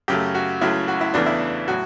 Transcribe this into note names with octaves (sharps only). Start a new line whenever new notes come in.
F#2 C#3 F#3 A3 G4
F#4
C#2 C#3 F#3 A3 E4
F#4
E4
E2 C#3 E3 A3 D4
E4
A2 F#3 F#4